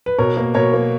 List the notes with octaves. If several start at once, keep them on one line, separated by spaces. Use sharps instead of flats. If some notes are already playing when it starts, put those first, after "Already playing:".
B4
B2 A#4 C#5
A#3
B2 A#4 C#5
A#3